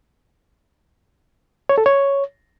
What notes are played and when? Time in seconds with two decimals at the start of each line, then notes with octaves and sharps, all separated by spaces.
1.69 C#5
1.78 A4
1.86 C#5